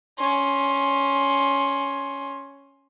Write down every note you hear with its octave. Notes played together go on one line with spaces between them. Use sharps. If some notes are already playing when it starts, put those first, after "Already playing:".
C#4 C6